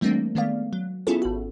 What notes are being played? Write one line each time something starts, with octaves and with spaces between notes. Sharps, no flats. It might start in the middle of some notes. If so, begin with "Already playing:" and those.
E3 G3 A3 A#3 C4 D4
D#3 G#3 A3 B3 D5 F5
F#3
B3 C#4 E4 F4 G#4 A4
G#1 F#4